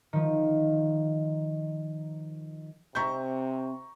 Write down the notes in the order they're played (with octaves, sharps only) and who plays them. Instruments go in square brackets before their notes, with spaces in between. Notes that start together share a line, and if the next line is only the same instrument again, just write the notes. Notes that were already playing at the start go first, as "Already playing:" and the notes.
[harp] D#3 F3
[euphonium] C3 [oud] C4 E5 [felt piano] A#5 C#6 G6